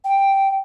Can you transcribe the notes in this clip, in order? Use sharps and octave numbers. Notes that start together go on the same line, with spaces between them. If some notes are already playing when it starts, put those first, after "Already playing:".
G5